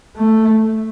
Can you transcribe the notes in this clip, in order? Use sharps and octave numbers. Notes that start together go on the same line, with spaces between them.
A3